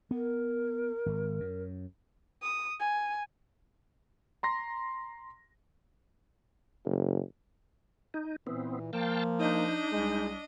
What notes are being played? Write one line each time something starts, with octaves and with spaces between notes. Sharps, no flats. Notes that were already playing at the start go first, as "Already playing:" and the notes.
B3 A#4
G#1
F#2
D#6
G#5
A#5 C6 A#6
F#1
D#4
A#2 E3 B3 C4
F3 A#3 F5 G5 A5
D4 D#4 D#5
C2 G#3